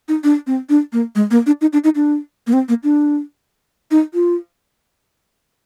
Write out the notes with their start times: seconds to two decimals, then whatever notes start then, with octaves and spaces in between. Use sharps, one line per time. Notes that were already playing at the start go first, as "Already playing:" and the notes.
0.08 D#4
0.24 D4
0.47 C4
0.69 D4
0.93 A#3
1.15 G#3
1.31 A#3
1.46 D4
1.61 D#4
1.73 D4
1.84 D#4
1.95 D4
2.47 A#3
2.53 C4
2.69 A#3
2.84 D4
3.91 D#4
4.14 F4